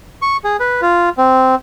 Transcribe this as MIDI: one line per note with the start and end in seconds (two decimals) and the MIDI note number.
0.22 0.37 85
0.44 0.57 68
0.60 0.81 71
0.82 1.09 65
1.18 1.55 60